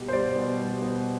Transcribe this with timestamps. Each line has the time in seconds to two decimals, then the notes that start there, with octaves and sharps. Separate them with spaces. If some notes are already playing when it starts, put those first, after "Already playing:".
Already playing: B2 G3 G4
0.08 C5
0.12 G3 D5
0.35 B2
0.58 G3
0.82 B2